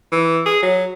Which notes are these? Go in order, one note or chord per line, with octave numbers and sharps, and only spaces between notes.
E3
G#4
F#3